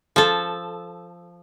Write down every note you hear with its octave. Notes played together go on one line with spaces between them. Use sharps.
F3 A4